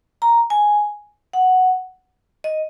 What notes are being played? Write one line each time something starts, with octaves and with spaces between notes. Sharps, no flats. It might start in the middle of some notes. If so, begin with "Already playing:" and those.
A#5
G#5
F#5
D#5